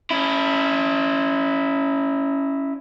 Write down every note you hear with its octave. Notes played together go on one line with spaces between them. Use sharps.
C#4 E4